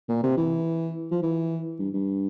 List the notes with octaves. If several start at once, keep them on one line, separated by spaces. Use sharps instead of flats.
A#2
C3
E3
F3
E3
G2
G2